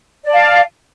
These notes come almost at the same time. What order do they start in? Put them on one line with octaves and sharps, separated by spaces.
D5 A5 F5